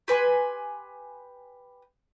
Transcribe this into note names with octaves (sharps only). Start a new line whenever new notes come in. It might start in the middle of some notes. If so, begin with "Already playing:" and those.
G4 B4 G#5 C6